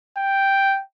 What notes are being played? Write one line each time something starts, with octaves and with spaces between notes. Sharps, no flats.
G5